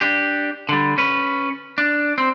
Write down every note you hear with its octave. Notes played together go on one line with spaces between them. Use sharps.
D4 G4
D3 G3
C#4 B4
D4
C4